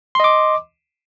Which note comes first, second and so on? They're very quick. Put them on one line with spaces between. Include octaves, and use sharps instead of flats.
C6 D#5 D6